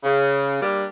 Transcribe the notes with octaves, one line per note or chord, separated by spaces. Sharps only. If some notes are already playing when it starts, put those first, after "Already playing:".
C#3
G3 A#3 D4